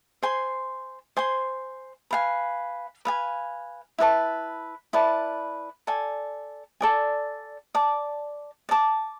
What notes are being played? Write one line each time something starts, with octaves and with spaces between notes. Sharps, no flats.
C5 G#5 C6
C5 G#5 C6
B4 F5 G#5
B4 F5 G#5
E4 B4 D5 A5
E4 B4 D5 A5
A4 D5 G#5
A4 D5 G#5
D5 A5 D6
D5 A5 D6